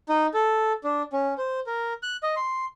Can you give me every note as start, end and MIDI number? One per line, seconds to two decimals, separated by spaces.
0.09 0.27 63
0.34 0.73 69
0.84 1.02 62
1.13 1.34 61
1.38 1.60 72
1.67 1.93 70
2.03 2.17 90
2.23 2.35 75
2.36 2.65 84